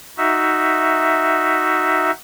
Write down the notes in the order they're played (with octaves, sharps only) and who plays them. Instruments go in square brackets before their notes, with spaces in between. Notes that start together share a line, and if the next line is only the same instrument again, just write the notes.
[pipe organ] D#4 F#4 E5